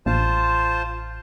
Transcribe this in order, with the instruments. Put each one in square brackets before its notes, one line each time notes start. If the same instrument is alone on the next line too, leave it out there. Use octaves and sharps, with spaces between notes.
[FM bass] A1 [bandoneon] F4 C5 A5